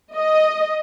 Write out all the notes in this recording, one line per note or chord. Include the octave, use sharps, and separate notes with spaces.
D#5